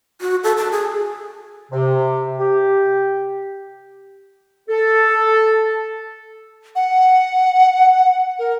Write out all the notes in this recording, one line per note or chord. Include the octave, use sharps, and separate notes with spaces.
F#4
A4
A5
G#4
C3
G4
A4
F#5
A#4